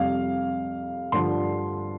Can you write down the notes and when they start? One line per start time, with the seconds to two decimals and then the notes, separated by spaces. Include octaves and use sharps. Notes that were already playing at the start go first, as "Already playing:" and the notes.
Already playing: F2 C3 G3 F5
1.12 G2 D3 F3 C6